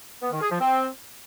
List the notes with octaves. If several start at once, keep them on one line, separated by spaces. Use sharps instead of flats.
B3
D#3
G#4
F3
C4